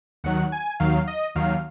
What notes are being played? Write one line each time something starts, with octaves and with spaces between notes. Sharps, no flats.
D#2 D#3 F#3 F#5
G#5
D#2 D#3 F#3 F5
D#5
D#2 D#3 F#3 F5